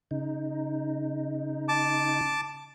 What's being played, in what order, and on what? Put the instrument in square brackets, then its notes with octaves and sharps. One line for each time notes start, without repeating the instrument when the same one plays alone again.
[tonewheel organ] C#3 D#4
[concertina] A5 D6